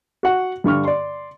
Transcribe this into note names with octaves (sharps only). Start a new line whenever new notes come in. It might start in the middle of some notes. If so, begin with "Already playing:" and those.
F#4 F#5
G2 D3 C#6 F6
D5 C6